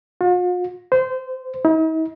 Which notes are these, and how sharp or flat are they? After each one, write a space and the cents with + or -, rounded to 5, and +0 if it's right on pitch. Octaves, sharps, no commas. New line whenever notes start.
F4 +45
C5 -25
D#4 +45